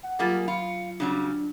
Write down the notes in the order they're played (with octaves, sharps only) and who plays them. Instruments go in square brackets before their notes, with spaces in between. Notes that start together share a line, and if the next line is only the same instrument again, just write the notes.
[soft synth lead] F#5
[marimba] F#3 F4 A6 [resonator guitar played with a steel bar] G3 A#3 G#4
[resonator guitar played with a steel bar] F4 [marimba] B5 [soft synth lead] C#7
[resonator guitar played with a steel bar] C#3 F#3 G3 [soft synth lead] D4